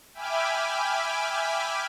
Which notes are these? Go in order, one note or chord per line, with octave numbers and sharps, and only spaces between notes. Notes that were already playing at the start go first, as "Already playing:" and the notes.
E5 G5 G#5 B5 D6 F6